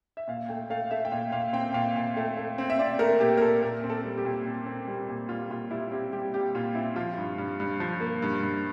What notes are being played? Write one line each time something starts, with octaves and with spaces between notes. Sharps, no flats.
E5
A#2 F5
A3 G5
A3 F5
A3 E5
G5
A#2 F5
A#2 F5
C4 G5
A#2 F5
A#2
A3
A3
C4
E5
C4 D5
A3 A#4
A#2 G4
A#4
A#2 A4
A#2 A#4
C4
A4
G3
G4
A#2
C4
C4
G3
A#2
G3 F4
A#2 F4
G3 E4
C4 G4
G3 G4
G3 G4
A#2 F4
C4 E4
F3 F4
G2
G2
G2
F3
A#3
G2
G2